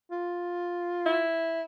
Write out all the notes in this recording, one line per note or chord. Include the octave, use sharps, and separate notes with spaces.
F4
E4